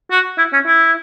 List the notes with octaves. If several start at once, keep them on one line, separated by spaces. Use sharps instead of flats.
F#4
E4
C#4
E4